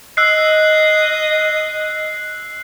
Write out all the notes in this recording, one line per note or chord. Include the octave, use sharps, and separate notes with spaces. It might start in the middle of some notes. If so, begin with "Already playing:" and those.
D#5 E6 F#6 C7